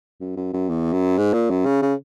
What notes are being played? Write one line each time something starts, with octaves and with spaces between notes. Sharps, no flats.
F#2
F#2
F#2
E2
F#2
G#2
A#2
F#2
C#3
C#3